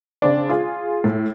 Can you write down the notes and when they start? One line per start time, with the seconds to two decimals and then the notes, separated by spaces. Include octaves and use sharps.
0.22 C#3 C4 D4
0.49 F4 G#4
1.04 A2